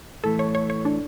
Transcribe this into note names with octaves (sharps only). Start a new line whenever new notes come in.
A2 E3 A3 A4
C#5
C#5
C#5
D4